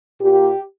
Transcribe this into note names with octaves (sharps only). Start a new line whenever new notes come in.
A#2 G4